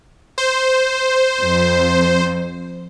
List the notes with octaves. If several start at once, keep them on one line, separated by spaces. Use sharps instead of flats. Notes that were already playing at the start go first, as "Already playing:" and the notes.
C5
F2